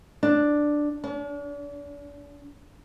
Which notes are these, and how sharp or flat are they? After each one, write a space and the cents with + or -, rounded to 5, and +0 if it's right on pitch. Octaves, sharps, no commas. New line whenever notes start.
D4 +5
D4 -40